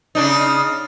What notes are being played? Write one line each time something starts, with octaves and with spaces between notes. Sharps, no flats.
C#3 D4 D#4